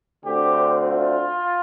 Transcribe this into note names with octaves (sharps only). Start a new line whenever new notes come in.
D2 D3 A3 C4 G4
F4